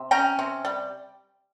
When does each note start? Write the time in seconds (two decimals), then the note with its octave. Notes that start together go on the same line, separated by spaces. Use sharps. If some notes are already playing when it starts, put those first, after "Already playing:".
Already playing: C3
0.11 C#4 G5 A#5
0.39 C3
0.65 G3